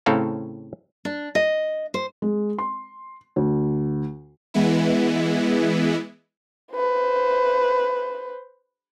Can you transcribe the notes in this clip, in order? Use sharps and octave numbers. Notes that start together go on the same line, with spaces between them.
A2 C#3 C4 A4 F5 A#5
D4
D#5
C5
G#3
C6
D2
E3 G#3 B3 E4
B4 C5